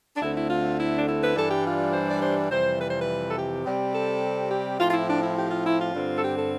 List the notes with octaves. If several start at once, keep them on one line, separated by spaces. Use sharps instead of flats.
D4
D2 D3 A3 C4 E4
E4
F4
E4
D4
E4
B4
G2 E3 G3 D4 A4
G4
F4
C5
D5
C5
F2 C3 E3 G3 C5
B4
C5
B4
A4
G4
C3 G3 C4
A4
G4
A2 F3 C4 F4
F4
E4
D4
E4
G4
F4
E4
F4
G2 D3 G3 C4
A4
G4
A4